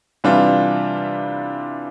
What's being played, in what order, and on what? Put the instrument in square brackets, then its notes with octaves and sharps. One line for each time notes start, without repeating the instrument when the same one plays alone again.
[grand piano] C3 E3 G3 D4 F4